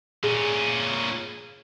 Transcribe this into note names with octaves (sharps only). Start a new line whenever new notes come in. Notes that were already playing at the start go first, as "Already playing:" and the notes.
A#2 C#4 G#4